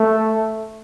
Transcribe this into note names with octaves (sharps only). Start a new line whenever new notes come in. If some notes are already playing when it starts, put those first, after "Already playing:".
Already playing: A3